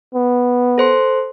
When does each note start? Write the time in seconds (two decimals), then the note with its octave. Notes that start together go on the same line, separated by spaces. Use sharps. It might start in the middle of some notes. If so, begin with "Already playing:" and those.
0.15 B3
0.78 A4 C5 C6